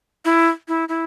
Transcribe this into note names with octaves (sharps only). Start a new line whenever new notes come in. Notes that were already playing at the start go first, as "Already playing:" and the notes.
E4
E4
E4